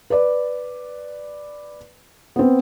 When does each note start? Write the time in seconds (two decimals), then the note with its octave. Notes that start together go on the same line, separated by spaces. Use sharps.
0.10 B4 D5
2.36 B3 C4